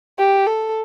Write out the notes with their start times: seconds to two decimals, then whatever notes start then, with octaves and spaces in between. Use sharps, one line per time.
0.18 G4
0.47 A4